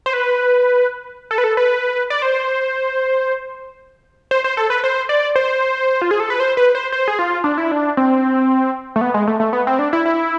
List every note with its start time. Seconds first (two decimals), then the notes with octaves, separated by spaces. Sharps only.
0.06 C5
0.13 B4
1.31 A4
1.38 B4
1.44 A4
1.57 B4
2.10 D5
2.22 C5
4.31 C5
4.44 C5
4.57 A4
4.70 B4
4.84 C5
5.09 D5
5.36 C5
6.02 F4
6.11 G#4
6.20 A4
6.30 B4
6.40 C5
6.57 B4
6.75 C5
6.92 C5
7.08 G#4
7.19 F4
7.44 D4
7.58 E4
7.71 D4
7.97 C4
8.96 A3
9.01 B3
9.14 G#3
9.28 A3
9.40 A3
9.53 B3
9.67 C4
9.79 D4
9.93 E4
10.06 E4